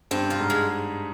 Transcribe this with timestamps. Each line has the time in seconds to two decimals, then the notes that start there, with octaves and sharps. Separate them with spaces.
0.11 G2 C4
0.30 F4
0.40 G#2
0.50 G#3